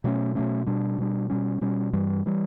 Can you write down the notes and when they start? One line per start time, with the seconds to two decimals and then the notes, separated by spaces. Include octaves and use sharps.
0.04 B2 F#3 A3 C#4
0.35 B2 F#3 A3 C#4
0.66 B2 G3 D4
0.98 B2 G3 D4
1.30 B2 G3 C#4
1.61 B2 G3 C#4
1.93 G2 E3 G3
2.26 E3 G3